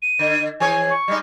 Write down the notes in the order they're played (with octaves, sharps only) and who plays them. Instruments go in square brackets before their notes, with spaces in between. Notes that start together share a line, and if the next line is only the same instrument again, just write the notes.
[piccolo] D#7
[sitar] D3
[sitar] E3 G#4 C#5 [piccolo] G#5
[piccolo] C#6
[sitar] G3 G#3 D#4